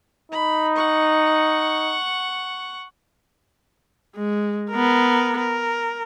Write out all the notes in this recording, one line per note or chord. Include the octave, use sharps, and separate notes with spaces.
D#4 B5
F#5 C#6
G#3
B3 A#4
A#4